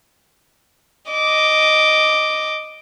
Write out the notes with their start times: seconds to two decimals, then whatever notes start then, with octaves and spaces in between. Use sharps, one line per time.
1.12 D#5 D6